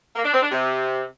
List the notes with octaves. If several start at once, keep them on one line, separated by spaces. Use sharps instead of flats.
A#3
D4
C4
D4
C3